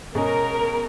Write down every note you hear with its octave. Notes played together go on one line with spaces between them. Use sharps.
B2 G#3 C#4 G#4 A#4 D#5